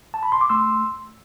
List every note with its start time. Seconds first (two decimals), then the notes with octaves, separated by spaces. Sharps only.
0.14 A5
0.23 B5
0.32 C6
0.41 D6
0.50 A3 C6 E6